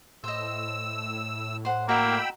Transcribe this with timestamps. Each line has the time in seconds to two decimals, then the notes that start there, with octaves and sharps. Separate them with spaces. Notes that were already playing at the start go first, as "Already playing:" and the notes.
0.24 A2 C5 D#5 E6
1.65 C5 F#5
1.89 A#3 F#4 D#5 G5 A#5 B5 E6